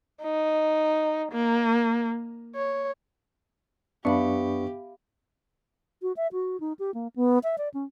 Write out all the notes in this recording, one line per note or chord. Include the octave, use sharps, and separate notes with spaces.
D#4
A#3
C#5
F#2 B3 D4 G4 E5 F5 B5 C#6
F#4
E5
F#4
D#4
G4
A#3
B3
E5
D5
C#4